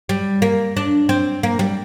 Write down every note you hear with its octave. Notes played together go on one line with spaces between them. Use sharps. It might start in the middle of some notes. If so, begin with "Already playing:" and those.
G3
A#3
D4
C4
A#3
G3